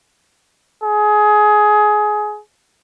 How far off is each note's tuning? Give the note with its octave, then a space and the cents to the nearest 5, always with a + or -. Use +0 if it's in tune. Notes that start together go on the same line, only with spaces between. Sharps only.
G#4 +20